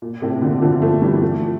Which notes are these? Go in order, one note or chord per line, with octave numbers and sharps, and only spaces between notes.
A#2
A2 C3
A#2 D3
D3 F3
F3 A3
E3 G3
F3 A3